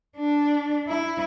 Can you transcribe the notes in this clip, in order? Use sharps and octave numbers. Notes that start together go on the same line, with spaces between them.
D4
E4